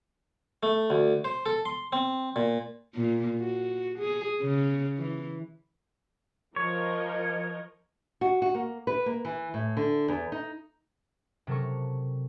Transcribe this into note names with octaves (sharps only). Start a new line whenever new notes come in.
A3
D2
C5
A4
C6
C4
A#2
A#2
F#4
G#4
C#3
E3
F3 A#4 C#5 D#5
F#4
F#4
A#3
B4
A#3
E3
A2
D3
E2
D#4
C3 F#3 A4 A#4 C#6